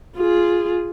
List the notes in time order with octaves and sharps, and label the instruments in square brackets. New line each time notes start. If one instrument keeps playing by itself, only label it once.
[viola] F4 G#4